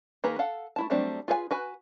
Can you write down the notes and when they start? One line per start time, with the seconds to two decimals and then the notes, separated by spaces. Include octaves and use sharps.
0.24 D#3 A#3 G#4 B4 A#5
0.39 A4 F5 F#5
0.76 A3 E4 A5
0.90 F#3 G3 A3 C4 D4
1.28 F4 G#4 B4 F5 G#5
1.51 F#4 B4 G#5